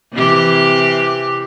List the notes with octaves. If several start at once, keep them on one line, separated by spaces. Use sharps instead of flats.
C3 E3 G4